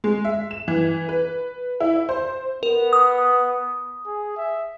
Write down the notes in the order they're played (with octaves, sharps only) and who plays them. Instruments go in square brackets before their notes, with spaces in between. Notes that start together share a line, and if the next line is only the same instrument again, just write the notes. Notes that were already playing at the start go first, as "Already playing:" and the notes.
[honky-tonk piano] G#3
E5
E7
E3
B4
E4
C5
[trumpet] B3 [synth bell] A#4
[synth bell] D#6
[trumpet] G#4
E5